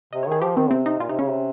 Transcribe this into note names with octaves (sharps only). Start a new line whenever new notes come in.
C3 D#5
C#5
D#3 G#4
F3 G4
D#3 C4
C3 C4
D#4
A#2 F4
C3 D#4
C#3 C#4
C3